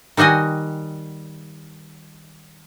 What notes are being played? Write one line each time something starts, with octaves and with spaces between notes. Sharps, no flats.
D#3 G3 F#4 D#5 G#5